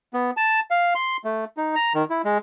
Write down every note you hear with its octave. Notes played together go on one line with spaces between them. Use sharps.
B3
A5
F5
C6
A3
D#4
A#5
D#3
E4
G#3